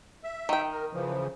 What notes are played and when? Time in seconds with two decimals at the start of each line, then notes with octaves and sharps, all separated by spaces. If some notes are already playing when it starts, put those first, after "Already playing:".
0.24 E5
0.49 D#3 G5
0.72 A#4
0.93 C#3 E3 F3